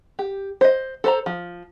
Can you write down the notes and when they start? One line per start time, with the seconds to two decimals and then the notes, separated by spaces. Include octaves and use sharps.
0.19 G4
0.61 C5 D#5
1.04 A4 C5 A#5
1.26 F3